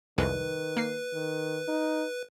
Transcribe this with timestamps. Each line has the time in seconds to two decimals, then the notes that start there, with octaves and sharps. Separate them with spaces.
0.18 C2 F2 D#3 G#3 B4
0.77 A#3 C7
1.14 D#3
1.68 D#4